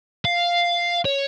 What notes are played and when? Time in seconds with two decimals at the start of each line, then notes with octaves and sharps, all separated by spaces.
0.25 F5
1.05 C#5